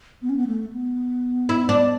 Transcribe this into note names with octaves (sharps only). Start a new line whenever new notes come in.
B3
C#4
B3
A3
B3
E4
D4